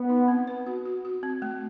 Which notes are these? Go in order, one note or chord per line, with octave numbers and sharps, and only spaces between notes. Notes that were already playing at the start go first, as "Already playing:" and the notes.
Already playing: B3
D#4
C4
B4
F#4
F#4
F#4
C4
A3